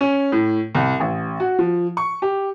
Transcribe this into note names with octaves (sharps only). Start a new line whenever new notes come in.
C#4
A2
C2
A1
F#4
F3
C#6
G4